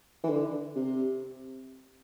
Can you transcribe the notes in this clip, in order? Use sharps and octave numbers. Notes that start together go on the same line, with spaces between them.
E3
D3
C3